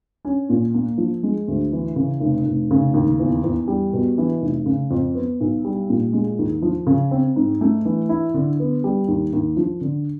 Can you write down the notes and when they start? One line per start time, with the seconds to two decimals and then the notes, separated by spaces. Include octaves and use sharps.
0.25 C#4
0.49 A#2
0.74 A#3
0.98 F3
1.23 G#3
1.48 D2
1.72 E3
1.96 C#3
2.20 F1
2.45 F1
2.71 C#3
2.94 D#2
3.20 E2
3.44 E2
3.68 G3
3.93 B2
4.18 E3
4.41 F1
4.66 C#3
4.91 F2
5.15 B3
5.41 B1
5.65 G3
5.90 A#2
6.13 G#3
6.39 D#2
6.62 F3
6.87 C#3
7.11 C4
7.36 G#2
7.61 A3
7.85 E3
8.09 E4
8.34 D3
8.59 B3
8.84 G3
9.08 D#2
9.33 D#2
9.57 F3
9.81 D3